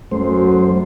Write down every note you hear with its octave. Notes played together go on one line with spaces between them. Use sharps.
F#2 F#3 A3 C5